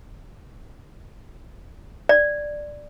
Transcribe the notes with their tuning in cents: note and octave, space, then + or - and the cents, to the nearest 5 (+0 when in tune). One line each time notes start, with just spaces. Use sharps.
D5 +5